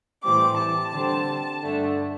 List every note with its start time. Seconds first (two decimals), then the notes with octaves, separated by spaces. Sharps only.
0.23 A2 E3 G3 C4 D6
0.58 A5
0.93 D3 G3 C4
1.62 G2 D3 A3 D4